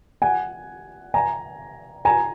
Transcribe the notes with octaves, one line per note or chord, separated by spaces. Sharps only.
F#5 G#5
G#5 A#5
G#5 A#5